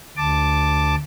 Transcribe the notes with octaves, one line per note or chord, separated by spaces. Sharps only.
D2 A5 D6